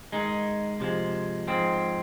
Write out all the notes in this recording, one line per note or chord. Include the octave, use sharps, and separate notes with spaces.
G#2 D#3 G#3 D#4
C3 F3 G#3
G#2 F3 G#3 C4